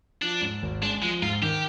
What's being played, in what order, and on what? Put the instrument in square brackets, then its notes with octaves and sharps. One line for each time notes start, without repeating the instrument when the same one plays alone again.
[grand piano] F3 [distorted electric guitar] D4
[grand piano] G#2
G#1
[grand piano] G#3 [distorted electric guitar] D4
[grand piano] F3 [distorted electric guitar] G#3
[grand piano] G#2 [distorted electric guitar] F4
[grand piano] D#3 [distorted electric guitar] G4